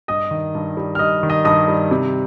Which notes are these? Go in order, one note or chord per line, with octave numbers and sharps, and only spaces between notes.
G2 D#5 D#6
D#3
G2
G3
F6
G2 D#5 D#6
D#3
D#5 D#6
G2 D#5 D#6
G3
C3